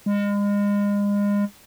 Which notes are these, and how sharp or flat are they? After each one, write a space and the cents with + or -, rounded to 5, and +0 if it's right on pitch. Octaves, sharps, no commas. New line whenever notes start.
G#3 -35